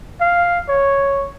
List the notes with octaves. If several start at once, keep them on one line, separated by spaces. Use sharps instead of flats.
F5
C#5